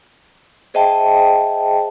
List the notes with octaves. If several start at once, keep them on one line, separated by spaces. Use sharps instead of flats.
G#4 C5 D#5 E5 G5 A5